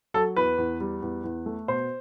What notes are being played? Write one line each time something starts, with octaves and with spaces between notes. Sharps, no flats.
F#3 A4
E2 B4
E2
G3
E2
E2
A3
B2 C5